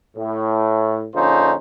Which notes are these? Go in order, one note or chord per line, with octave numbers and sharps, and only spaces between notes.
A2
A#1 D3 C#4 D#4 F4 C5